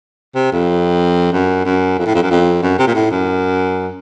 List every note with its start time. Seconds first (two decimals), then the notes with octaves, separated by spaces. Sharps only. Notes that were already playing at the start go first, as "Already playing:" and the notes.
0.35 C3
0.52 F2
1.32 F#2
1.65 F#2
1.98 F2
2.06 A2
2.15 F2
2.22 F#2
2.30 F2
2.62 F#2
2.78 C3
2.87 A#2
2.95 A2
3.11 F#2